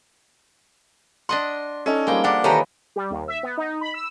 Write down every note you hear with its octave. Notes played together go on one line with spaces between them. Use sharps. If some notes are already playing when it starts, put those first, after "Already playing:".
D4 D#5 F#5 C6
C#4 D#4 A4
F3 G3 G#3 A#3 G5
D4 A#4 F#5 D6
D#3 E3 A3 G4 B4 C#5 A#5
G3
D#2
E5
B3
D#4
B5
E6